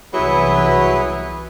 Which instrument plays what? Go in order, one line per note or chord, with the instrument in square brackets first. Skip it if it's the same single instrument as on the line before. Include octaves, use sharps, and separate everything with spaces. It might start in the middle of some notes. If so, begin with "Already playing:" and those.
[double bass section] C2 E3 [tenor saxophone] F#3 [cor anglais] B3 [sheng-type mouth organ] E4 G#4 B4